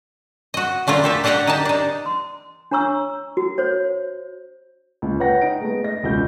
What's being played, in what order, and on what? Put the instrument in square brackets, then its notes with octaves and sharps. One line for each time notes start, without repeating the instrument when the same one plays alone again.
[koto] F#4 D#5
A#2 A3 D4 F4 A#4
G4 A4 E5
D4 G4 D#5 F#5 G5 A#5
D#4 G4 A#4 A5
D4 D#4
[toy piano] C6
D4 C#5 A#5 C#6 E6
F#4
C5 C#5
[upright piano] C#2
B4 C#5 F#5 G5 A#6
D#4 D7
G#3 A3 B3
D#5 A#6
E1 C#2 F#4 G6